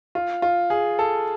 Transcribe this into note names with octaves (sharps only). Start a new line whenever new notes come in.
F4
F4
G#4
A4